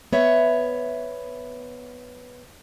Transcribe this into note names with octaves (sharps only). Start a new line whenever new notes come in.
B3 C#5 E5